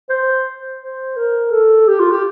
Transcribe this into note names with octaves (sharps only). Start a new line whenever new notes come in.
C5
C5
A#4
A4
G4
F4
G4